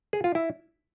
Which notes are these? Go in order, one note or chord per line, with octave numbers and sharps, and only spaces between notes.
G#4
F4
E4